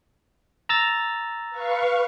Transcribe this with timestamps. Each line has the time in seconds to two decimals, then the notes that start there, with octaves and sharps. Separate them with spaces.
0.69 A#5 E6 A6
1.50 B4 F5 C#6